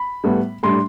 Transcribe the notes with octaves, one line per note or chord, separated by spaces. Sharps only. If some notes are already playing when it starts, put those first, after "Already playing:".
Already playing: B5
A2 G3 B3
A2 G3 D4 C6